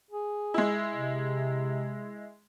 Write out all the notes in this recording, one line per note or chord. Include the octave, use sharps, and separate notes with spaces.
G#4
G#3 E4
C3